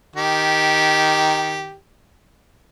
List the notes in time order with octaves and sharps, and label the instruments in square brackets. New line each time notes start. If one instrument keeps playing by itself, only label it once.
[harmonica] D#3 G4